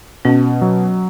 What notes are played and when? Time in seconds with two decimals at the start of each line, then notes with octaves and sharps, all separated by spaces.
0.25 B2 C#4
0.62 F#3